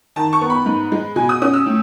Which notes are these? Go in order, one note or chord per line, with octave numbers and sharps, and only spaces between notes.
D#3 A5
C#6
B3
B5
G#2
G#3
B2 G#5
D#6
C#4 D#6
E6
A2